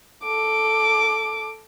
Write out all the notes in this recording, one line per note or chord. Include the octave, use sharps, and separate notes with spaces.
A4 D6